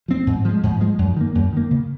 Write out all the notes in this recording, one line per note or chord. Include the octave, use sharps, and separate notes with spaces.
F3 C4
G#2
F3 G#3
G#2
F3 G#3
F#2
D#3 A#3
F#2
D#3 A#3
C#3